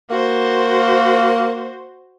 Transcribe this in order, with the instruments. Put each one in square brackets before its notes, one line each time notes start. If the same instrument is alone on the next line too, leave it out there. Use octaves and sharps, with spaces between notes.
[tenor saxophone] A#3 [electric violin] F#4 C5